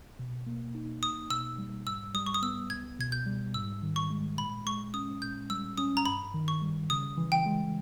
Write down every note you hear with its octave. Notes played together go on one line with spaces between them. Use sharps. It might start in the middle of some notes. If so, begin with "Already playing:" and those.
B2
A#3
D#4
E2 D#6
B2 E6
G3
G#2 E6
G3 D#6
C#6
D#6
B3 E6
C#2 G#6
B2 G#6
G6
G3
G#2 E6
D#3
C#6
G#3
A#2 B5
G#3 C#6
C#4 D#6
A#2 G6
G3 E6
C#4 D#6
A#5
G2 B5
D#3
C#6
G3
C#3 D#6
E3
G5
G#3